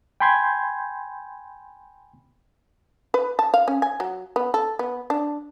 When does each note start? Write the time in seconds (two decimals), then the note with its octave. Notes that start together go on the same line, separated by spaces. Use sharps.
0.20 G5 G#5 B5 C6 G6 G#6
3.14 B4
3.39 A5
3.54 F5
3.68 C#4
3.82 G#5
4.00 F#3
4.36 B3
4.54 A4
4.79 B3
5.10 D4